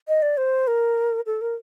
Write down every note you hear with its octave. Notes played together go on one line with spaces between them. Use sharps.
D#5
D5
C5
A#4
A4
A#4